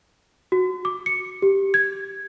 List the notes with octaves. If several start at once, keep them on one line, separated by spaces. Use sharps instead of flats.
F#4
D6
C#7
G4
G#6